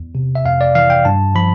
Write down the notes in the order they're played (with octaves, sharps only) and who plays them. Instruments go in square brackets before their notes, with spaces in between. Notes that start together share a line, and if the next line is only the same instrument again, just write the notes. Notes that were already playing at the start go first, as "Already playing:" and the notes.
Already playing: [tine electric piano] E2
C3
E5
F2 F5
D5
E3 F5
G5
G2 A5
F3 B5